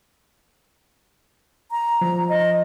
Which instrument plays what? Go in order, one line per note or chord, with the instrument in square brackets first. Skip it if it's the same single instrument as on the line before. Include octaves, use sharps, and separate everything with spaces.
[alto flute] A#5
[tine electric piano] F3
[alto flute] D#5